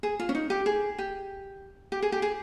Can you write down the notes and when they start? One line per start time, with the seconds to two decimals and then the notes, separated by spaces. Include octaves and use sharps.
0.03 G#4
0.19 F4
0.29 C#4
0.35 D#4
0.50 G4
0.66 G#4
0.98 G4
1.92 G4
2.02 G#4
2.12 G4
2.22 G#4